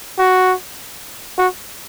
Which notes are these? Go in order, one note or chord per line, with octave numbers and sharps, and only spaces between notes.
F#4
F#4